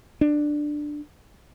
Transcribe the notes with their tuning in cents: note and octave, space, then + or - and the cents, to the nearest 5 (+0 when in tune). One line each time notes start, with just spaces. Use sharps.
D4 +10